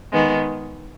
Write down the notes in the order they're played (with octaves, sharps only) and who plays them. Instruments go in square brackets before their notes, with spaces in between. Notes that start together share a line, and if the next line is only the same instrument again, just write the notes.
[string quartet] D#3 G#3 B3